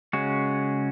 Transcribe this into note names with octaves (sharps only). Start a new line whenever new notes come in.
C#3 G#3 C#4 F#4